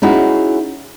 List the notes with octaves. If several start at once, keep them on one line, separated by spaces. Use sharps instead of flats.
C#4 D#4 E4 F#4 G#4